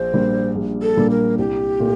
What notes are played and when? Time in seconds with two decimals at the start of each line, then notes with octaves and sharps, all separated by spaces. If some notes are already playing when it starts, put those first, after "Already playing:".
Already playing: A#1 C5
0.13 A#2 G3 A#3 D4
0.55 A#1
0.82 A4
0.97 A#2 G3 A#3 D4
1.10 A#4
1.38 C2 G4
1.80 A#2 A3